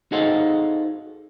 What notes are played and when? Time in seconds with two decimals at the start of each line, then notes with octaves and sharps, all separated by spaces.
0.12 D#4 F#4 G#4 A4 C5 F5